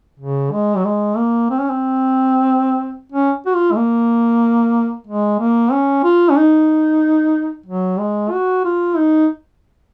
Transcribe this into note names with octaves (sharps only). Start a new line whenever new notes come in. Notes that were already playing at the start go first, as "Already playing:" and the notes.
C#3
G#3
F#3
G#3
A#3
C4
C#4
C4
C#4
F#4
F4
G#3
A#3
G#3
A#3
C#4
F4
C#4
D#4
F#3
G#3
F#4
F4
D#4